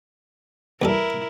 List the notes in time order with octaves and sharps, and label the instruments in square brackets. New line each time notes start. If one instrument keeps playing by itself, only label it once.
[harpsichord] E2 G3 A4 [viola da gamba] E4 A#4